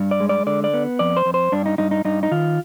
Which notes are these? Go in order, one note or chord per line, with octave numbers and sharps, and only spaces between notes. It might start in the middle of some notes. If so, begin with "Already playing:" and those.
Already playing: G2
D5
G#3
D5
D3 D5
D5
B3
F2 D5
C5
F2
C5
G2 D4
D#4
G2 D#4
D#4
G2 D#4
D#4
D#3 F4